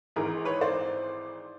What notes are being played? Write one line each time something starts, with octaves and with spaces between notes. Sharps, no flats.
G#1 G#2 E3 G#4 A#4
B4 C#5
C5 D5